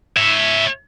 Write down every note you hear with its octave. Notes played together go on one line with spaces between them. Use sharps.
C#5 E5